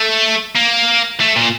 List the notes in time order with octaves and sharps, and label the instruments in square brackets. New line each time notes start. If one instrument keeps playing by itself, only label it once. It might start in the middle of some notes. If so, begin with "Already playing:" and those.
Already playing: [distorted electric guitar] A3
A#3
A3
A#2